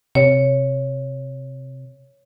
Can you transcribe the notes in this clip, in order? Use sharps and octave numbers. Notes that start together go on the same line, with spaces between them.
C3 C#5